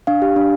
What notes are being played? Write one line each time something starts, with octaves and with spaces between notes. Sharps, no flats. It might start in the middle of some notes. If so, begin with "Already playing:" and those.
D4 F5
G4
D4